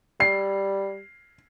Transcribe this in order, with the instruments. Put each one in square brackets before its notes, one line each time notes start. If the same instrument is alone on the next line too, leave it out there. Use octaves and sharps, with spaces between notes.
[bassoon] G3 [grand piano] C7